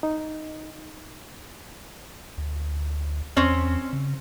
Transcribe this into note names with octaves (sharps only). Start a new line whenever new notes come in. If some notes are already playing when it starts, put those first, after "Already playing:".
D#4
D2
E2 C4 C#4
C#3